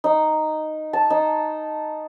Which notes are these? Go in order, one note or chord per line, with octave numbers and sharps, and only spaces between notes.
D#4
A5
D#4